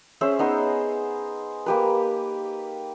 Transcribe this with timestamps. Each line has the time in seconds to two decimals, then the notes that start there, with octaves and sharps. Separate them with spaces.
0.21 C#4 G#4 C5 E5
0.39 B3 D#4 C5
1.66 A#3 G4 B4